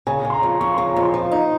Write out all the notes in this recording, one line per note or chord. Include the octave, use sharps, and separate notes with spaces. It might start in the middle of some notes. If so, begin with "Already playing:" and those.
C#3 G#5
C#3
C6
A#5
F2
F2 C#6
C#3 C6
A#5
F2
C6
F3
D#4